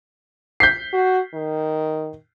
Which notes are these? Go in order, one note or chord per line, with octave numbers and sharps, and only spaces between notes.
G6 B6 C7
F#4
D#3